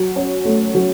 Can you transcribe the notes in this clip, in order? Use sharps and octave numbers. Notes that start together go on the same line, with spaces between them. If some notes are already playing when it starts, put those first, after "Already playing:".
Already playing: F#3
C#4
A3
F#3